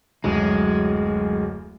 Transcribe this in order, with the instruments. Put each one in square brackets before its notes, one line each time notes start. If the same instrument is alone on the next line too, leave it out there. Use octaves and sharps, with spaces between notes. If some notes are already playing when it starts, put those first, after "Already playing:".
[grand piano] D1 F#2 [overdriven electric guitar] G#3